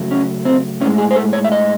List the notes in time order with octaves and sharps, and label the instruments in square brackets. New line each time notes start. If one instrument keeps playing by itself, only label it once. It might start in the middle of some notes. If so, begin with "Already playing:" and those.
Already playing: [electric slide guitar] F#2 C#3 F#3 A3
C#4
C4
A2 C#4
G#3
G#4
C5
A4
C#5
E5
D#5